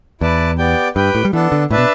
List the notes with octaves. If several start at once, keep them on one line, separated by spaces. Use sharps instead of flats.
E2 E4 B4 D5 A5
B3 G4 D5 G5
G2 G4 B4 G5
A2
G3
E3 B3 D4 A4
D3
A2 D4 B4 E5 A5
B2